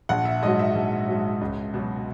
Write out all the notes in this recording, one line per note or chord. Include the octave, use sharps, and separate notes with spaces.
A#1 F#5
E5
G#2 F#3 D#5
E5
A#1
G#2 F#3
C#2
B2 F#3